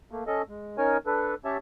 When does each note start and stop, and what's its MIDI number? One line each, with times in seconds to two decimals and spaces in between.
0.11 0.24 57
0.11 0.24 58
0.27 0.42 61
0.27 0.42 69
0.27 0.42 75
0.49 0.77 56
0.78 0.97 61
0.78 0.97 63
0.78 0.97 70
0.78 0.97 73
0.78 0.97 80
1.06 1.35 62
1.06 1.35 69
1.06 1.35 71
1.45 1.57 61
1.45 1.57 67
1.45 1.57 73
1.45 1.57 76
1.45 1.57 81